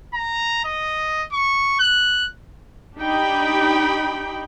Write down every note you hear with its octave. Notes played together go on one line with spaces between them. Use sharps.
A#5
D#5
C#6
F#6
D4 D#4 G4 G5 B5